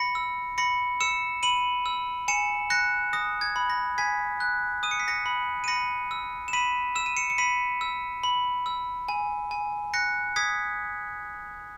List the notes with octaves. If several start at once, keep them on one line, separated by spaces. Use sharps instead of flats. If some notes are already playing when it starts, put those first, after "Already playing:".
Already playing: B5 A#6 C#7
E6
B5 A#6 C#7
E6 C#7 E7
B5 D#7 F#7
E6
G#5 C#7 E7
F#6 A#6 C#7
D#6 A#6
G#6
B5
A#6
G#5 G#6 B6
F#6
D#6 D#7
C#7
B6
A#6 C#7
B5
D#7
B5 A#6 C#7
E6
E7
B5 B6 D#7
E6 E7
D#7
C#7 E7
C#7
B5 B6 D#7
E6
B5
E6
G#5
G#5
F#6 A#6 C#7
D#6 G#6 B6